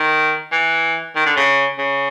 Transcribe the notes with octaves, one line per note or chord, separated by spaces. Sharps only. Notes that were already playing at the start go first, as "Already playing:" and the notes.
Already playing: D#3
E3
D#3
D3
C#3
C#3